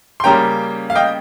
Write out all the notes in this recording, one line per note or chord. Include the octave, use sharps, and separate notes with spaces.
C6
C#3 G3 A#3 C#4 G5 A#5
F5
D#5 G5